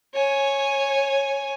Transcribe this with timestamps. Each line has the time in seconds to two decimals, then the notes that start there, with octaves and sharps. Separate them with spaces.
0.14 C#5 G#5